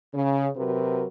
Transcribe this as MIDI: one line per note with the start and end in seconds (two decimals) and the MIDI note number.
0.13 0.48 49
0.56 1.05 48
0.56 1.05 54
0.56 1.05 66
0.56 1.05 70
0.56 1.05 71